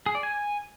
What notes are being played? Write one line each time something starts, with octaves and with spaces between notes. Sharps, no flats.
G#4
D5
G#5